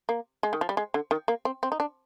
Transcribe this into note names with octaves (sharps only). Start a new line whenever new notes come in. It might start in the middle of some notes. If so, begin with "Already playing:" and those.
A#3
G#3
D#3
F3
G3
G#3
D3
D#3
A#3
C4
C4
D#4
D4